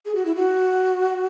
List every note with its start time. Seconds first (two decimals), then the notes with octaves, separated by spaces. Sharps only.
0.06 G#4
0.15 F#4
0.25 E4
0.35 F#4